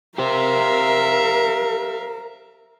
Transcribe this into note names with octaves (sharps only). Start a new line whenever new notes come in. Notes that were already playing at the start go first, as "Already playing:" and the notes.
G4 A#4 C5 E5 F5